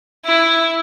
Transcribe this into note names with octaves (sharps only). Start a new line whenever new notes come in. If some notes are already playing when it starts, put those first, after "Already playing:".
E4